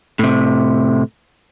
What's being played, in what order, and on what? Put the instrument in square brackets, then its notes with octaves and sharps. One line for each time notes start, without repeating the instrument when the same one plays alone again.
[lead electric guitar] A2 C3